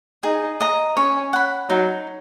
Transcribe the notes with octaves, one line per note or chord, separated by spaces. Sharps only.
D#4 G#4
D#5 A#5
C#4 C#5
F#5 B5
F#3 D#4